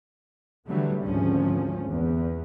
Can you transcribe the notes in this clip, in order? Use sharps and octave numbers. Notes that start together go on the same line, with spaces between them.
D3 E3 F#3 G3 A3
G#1 D2 F3 C#4
E2